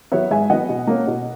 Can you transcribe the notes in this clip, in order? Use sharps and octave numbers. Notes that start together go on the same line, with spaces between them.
F#3 B3 C#5 E5
G#2 E5 G#5
F#3 B3 D#5 F#5
B2
A#3 C#4
B2